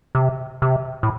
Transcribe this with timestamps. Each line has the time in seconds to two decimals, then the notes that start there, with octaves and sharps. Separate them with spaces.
0.15 C3
0.62 C3
1.03 A2